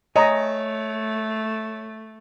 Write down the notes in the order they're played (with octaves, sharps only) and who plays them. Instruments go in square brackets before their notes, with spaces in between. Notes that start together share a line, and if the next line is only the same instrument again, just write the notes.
[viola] A3 [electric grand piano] C#5 [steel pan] D#5 [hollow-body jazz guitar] G#5 A#5